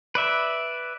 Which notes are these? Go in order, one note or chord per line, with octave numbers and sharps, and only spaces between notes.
B4 D5 E5